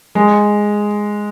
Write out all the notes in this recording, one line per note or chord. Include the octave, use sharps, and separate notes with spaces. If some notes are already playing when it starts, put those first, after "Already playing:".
G#3